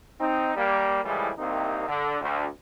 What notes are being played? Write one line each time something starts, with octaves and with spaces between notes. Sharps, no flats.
C4 D#4
G3 A#3
A2 E3 F3 G3 G#3
C2 C3 A#3 C4 D#4
D3
D2